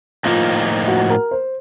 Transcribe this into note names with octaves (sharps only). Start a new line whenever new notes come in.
A2 F3 A#3 D#4 F4
F#4
A#4
C5